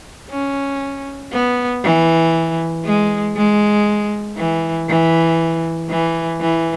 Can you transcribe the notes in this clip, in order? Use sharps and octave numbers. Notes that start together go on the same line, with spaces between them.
C#4
B3
E3
G#3
G#3
E3
E3
E3
E3